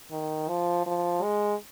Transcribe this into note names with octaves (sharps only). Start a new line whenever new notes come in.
D#3
F3
F3
G#3